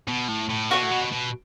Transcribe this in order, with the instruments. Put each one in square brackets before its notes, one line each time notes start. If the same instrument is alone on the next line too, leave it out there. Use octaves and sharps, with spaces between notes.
[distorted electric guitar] B2
A2
A2
[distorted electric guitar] B2 [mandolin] F#4 C#5 F#5
[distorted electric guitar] A2
B2
B2